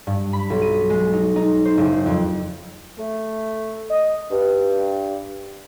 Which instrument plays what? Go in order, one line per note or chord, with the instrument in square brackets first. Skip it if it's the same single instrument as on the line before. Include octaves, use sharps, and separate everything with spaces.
[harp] G2
B5
B1
D#7
G#3
D#4
D#4
C5
F#1
F2
[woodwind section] A3
D#5
G2